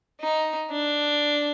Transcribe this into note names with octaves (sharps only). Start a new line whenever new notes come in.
D#4
D4